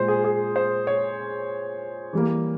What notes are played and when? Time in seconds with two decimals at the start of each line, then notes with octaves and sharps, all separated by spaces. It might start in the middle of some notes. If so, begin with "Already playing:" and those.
Already playing: A#2 G#3 C5
0.08 G#4
0.24 G#4
0.56 C5
0.87 C#5
2.13 E3 G3 A#3